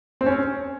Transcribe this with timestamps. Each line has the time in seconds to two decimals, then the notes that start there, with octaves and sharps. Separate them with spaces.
0.21 C4
0.26 C#4